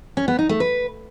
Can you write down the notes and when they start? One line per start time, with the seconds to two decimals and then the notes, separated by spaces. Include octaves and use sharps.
0.17 C#4
0.28 B3
0.39 D#4
0.49 A3
0.60 B4